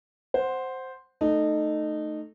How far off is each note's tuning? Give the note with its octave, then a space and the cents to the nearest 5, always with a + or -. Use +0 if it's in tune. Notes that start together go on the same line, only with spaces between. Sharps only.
C5 +0 F#5 +0
A3 +0 D#4 -20 A4 +0